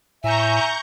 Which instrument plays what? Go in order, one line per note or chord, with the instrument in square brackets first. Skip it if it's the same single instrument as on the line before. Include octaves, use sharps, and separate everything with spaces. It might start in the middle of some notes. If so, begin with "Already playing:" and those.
[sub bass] A2 [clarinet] E5 [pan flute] G#5 [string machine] A#5 C#6 G6